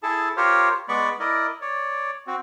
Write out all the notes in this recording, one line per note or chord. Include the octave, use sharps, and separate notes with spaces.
E4 G#4 A4 A5
F4 G4 A#4 C5 C#5
G#3 B3 D5 B5 C#6
E4 A#4 D5 D#5
C#5 D5
C4 F#4